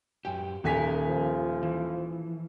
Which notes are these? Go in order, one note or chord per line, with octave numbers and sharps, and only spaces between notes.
F#2 G4 G5
D#1 D#3 A#4 G#5 B6
F3
E3